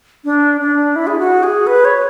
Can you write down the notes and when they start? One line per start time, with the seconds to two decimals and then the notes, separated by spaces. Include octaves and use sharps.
0.25 D4
0.61 D4
0.96 E4
1.07 G#4
1.19 F#4
1.43 G#4
1.67 B4
1.85 C#5